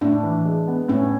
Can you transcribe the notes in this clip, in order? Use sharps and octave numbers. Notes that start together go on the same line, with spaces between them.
A2 D4
E3
G#3
B3
A2 C#4